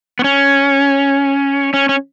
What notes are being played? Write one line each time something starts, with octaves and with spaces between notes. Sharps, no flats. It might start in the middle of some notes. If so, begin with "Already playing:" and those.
B3
C#4
C#4
C#4